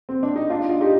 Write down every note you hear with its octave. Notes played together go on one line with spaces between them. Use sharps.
C4
D4
D#4
D4 F4
F4
D#4 G4